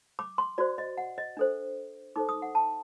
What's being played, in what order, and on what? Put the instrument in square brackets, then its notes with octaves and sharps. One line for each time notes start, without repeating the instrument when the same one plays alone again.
[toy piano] D6
C6
F#4 C5 D5
D#5
F#5
D#5
D4 A4 C5
D#4 A4 C5 D6
D#6
F#5
A5